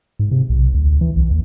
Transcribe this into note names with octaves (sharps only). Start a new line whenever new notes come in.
G#2
C3
B1
D2
E3
B1
D#2